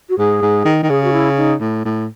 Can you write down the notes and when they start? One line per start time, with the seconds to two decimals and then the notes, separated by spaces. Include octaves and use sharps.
0.10 F#4
0.18 G#2 G#4
0.42 G#2
0.65 D#3
0.83 D#3
0.89 C#3 G#4
1.04 F#4
1.13 E4
1.37 D#4
1.61 A2
1.85 A2